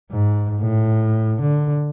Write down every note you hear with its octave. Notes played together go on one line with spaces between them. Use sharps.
G#2
A2
D3